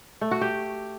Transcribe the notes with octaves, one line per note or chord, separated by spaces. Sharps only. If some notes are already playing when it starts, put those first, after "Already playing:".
A3
F#4
G4